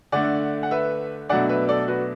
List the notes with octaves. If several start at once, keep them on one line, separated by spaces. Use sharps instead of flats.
D3 A3 D4 D5 F#5
F#5
B4 E5
B2 F#3 A3 D4 D5 F#5
B4 E5
A4 D5
F#4 B4